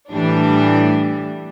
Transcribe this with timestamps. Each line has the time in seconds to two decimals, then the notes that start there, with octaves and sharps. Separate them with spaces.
0.10 A2 E3 G3 D4